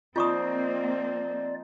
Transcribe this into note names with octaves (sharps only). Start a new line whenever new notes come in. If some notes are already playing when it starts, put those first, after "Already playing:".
F3 A#3 C4 D#4 F4 D5 C#6 D#6